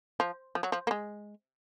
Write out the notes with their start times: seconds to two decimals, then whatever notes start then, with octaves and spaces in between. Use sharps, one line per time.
0.20 F3
0.55 F3
0.63 F#3
0.72 F3
0.87 A#3
0.91 G#3